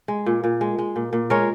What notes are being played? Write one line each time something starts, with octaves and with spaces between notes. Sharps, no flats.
G#3
A#2
A#2
G#3
G#3
A#2
A#2
G#3 A#4 C#5